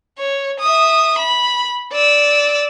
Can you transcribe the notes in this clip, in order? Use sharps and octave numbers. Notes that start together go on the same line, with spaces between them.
C#5
E5 D#6
B5
D5 E6